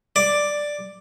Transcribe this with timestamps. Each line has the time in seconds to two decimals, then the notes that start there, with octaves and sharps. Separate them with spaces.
0.16 D5